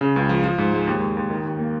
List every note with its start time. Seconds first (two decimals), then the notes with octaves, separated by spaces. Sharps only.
0.01 C#3
0.16 C#2
0.29 F3
0.44 F3
0.58 G#2
0.73 G#3
0.87 D#2
1.02 D#2
1.17 D#2
1.30 D#3
1.45 D#2
1.59 A#3